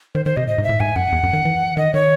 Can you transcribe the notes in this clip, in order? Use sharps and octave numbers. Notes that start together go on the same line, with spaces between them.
D#3 C5
D#3 C5
C3 D#5
A2 D#5
G#2
E5
A2
G#2 G#5
F#2 F#5
E2
F#2
D#3
E3
D#3 D#5
D#3 C#5